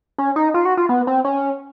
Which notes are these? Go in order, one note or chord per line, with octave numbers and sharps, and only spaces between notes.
C#4
D#4
F4
F#4
F4
B3
C4
C#4